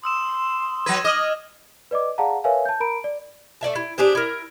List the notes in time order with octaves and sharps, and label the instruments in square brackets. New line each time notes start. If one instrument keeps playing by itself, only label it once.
[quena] C6 [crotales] D#6 E6 E7
[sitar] F#3 B4 [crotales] G#6 A#6 D#7
[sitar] D#5 [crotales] D6 F6 F#7 [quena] D#6
[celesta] B4 D5 D#5 D6
G#4 D5 F5 F#5 A5 A#5
A#4 B4 C#5 E5 F5 G#5
A5 G6
A#4 A#5 B5 D7
D5
[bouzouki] A3 D5 E5 A5
E4
D4 G4 G#4 C5
E4 A#4